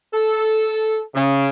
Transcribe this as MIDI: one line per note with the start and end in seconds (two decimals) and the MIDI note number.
0.13 0.99 69
1.15 1.48 49